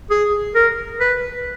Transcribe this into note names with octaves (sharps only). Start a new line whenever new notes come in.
G#4
A#4
B4